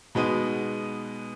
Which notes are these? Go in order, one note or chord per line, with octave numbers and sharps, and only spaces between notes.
B2 G#3 B3 D#4